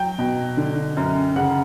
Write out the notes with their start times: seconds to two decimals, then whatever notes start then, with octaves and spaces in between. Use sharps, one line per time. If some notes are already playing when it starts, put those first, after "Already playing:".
Already playing: F#3 G5
0.19 B2
0.57 D3
0.97 F#2
1.36 C#3 F#5